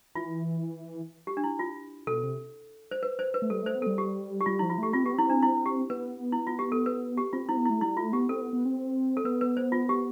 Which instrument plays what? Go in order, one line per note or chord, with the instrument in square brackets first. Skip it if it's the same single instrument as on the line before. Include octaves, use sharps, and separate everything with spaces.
[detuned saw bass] E3 [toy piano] F4
[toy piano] G4
D4
E4
F4
[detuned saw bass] B2 [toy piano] A4
[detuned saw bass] C3
[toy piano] C5
B4
C5
B4
[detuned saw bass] A3
[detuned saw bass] G3 [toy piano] A4
[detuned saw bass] A3 [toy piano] C5
[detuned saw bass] B3
[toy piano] A4
[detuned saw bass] G3
[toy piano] G4
G4
[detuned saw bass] G3 [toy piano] F4
[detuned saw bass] F3 [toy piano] E4
[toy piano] F4
[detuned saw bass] A3 [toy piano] G4
[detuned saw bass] C4 [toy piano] F4
[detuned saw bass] B3 [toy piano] G4
[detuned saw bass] C4 [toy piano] E4
[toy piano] D4
E4
G4
[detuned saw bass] B3 [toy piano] B4
[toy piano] E4
F4
G4
A4
B4
G4
[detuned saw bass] C4 [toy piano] F4
[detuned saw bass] C4 [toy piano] E4
[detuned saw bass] B3
[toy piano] E4
[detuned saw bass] A3
[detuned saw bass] G3 [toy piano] E4
[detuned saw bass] A3 [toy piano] F4
[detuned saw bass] B3 [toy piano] G4
[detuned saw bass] C4 [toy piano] A4
[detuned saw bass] B3
B3
C4
[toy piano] A4
[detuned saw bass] B3 [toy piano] B4
[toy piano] B4
C5
F4
G4